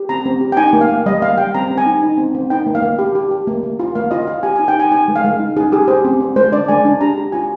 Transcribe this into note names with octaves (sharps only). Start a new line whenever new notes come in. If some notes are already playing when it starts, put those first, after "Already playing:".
Already playing: G4
C4 A#5
C4
G4
G5
D#4 G#5
A#3
F5
A#3
G3 D#5
A#3 F5
G3 G5
C4 A#5
C4
G#5
D#4
D#4
C4
C4
D#4 G5
A#3
F5
A#3
G4
G4
G4
A#3
A#3
F4
A#3 F5
F4 D#5
F4 F5
G4 G#5
D#4 G#5
G5
D#4 G#5
D#4 G#5
G#3
F5
G#3
D#4
D#4 G#4
G4 G#4
G4 C5
C4
C4
G#3 C5
D4 D5
G#3 G#5
D4
G4 A#5
G4
F4 G#5